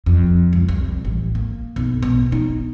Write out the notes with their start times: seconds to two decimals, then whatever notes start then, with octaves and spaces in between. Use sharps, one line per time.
0.06 F2
0.53 C#2
0.68 C2
1.05 A1
1.35 A#3
1.76 B1
2.02 B2
2.32 D#4